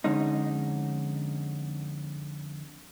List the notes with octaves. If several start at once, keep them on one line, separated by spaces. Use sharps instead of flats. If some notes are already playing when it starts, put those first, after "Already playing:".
F2 D3 G#3 C#4 D#4